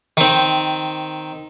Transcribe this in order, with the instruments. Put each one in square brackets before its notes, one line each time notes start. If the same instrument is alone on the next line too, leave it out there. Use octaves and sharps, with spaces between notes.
[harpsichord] D#3 C4